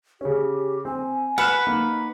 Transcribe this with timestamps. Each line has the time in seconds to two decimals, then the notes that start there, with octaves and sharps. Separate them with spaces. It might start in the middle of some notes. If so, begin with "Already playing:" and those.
0.21 C#3 C#4 G4
0.85 C4 G#5
1.38 B4 F#5 B5 F6 F#6 C#7 E7
1.67 A#3 D#4